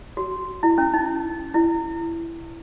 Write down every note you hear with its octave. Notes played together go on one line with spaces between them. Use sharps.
F#4
E4
C#4
D#4
E4